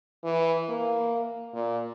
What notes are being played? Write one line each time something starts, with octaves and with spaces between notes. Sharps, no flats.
E3
A#3
A#2